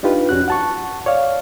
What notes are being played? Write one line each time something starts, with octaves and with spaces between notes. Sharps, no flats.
D4 D#4 F4 G4 B4
F2 C#4 F#4 F#6
F#5 A5 C#6
C#5 D5 F5